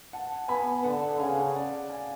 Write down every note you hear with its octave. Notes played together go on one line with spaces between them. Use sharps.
F#5 A5
B3 G#5 B5
D3 F#5 A5
F#5
C#3 F5 G#5
D5 F#5
F5 G#5